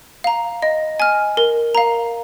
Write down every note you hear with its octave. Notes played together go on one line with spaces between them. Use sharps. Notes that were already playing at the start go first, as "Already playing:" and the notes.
F5 A#5
D#5
G#5 F6
A#4
F5 A#5